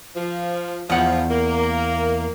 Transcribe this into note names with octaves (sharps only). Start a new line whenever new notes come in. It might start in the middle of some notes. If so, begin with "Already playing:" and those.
F3
E2 F3 F#5
A#3